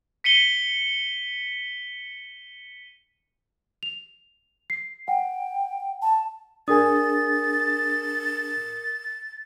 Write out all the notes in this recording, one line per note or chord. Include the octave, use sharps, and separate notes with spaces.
B6 C#7 D#7 G7
F7
C7
F#5 G5
A5
D4 G#4 A#4 G#5 D#6 A6